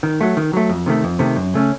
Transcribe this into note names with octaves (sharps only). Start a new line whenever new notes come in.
D#3
F#3 A3
D#3
F#3 A3
F2
C3 D#3 A3
F2
C3 D#3 A3
F#2
C#3 A3 C#4